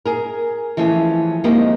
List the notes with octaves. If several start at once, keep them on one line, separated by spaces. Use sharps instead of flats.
G#4 A#4
E3 F3 A3 C#4 G#4
F3 G#3 A#3 C4 D#4 G4